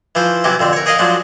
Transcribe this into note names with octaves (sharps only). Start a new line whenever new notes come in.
E3 F3 C5
C3 E3 F#3 G4
F2 D3 C4
A#4 C#5
G#4 A#4 C#5 D#5 F5 F#5
F3 F#3 G#3 D4 D#4